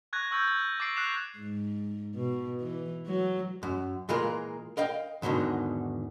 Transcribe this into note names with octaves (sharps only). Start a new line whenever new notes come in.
C#6 F#6 G#6 A#6
C#6 E6 G6 A6
A6
D6 E6 A6 C7 D7
F#6 C7 E7 F7
G#2
B2
E3
F#3
F#2
A#2 E3 G#3 F4 A#4
A#4 D#5 F5 G5
E2 G#2 B2 D3 D#3